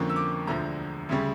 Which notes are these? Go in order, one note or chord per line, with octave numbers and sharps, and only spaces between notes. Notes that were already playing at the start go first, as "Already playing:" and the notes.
Already playing: F2 D3 F3 A#3 C#4
E6
D6
E1 D2 D3 F3 A#5
D2 C#3 G3 C#4